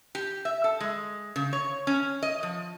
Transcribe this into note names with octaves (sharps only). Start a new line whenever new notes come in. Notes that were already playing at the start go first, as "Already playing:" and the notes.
G4
E5
A4
G#3
C#3
C#5
C#4
D#5
F3